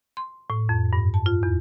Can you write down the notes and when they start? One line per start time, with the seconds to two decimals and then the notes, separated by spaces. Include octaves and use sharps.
0.17 C6
0.50 A2
0.69 F2
0.93 G2
1.14 A5
1.26 F4
1.43 E2